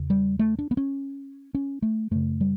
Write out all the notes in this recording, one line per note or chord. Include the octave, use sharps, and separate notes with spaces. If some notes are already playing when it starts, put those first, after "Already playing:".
Already playing: E2 C#3
G3
A3
D4
B3
C#4
C#4
A3
F#2 C#3 A3
G3